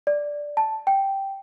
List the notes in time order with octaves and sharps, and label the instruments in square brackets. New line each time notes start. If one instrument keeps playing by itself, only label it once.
[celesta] D5
A5
G5